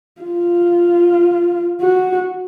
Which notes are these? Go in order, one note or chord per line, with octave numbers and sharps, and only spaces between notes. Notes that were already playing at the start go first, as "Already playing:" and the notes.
F4
F#4